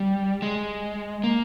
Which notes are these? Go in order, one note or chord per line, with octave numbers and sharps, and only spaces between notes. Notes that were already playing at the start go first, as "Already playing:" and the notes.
Already playing: G3
G#3
A#3